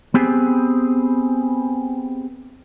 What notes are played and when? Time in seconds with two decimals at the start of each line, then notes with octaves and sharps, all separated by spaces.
0.14 B3 C4 G4 G#4